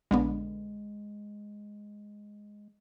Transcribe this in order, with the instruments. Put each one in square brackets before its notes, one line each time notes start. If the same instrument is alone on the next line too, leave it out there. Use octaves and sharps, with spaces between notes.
[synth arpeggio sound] A#1 D3 B3 [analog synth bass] G#3